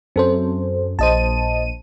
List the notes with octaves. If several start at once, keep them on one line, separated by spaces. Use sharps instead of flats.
F#2 C4 A4 C5
A#1 C5 D#5 A5 D#7